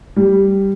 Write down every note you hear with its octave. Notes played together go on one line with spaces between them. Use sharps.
G3